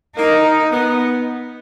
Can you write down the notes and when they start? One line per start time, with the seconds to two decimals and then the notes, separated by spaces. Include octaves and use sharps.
0.17 A#3 D#4
0.71 B3